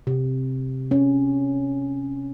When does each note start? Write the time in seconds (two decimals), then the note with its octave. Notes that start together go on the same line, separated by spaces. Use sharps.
0.07 C3
0.91 C#4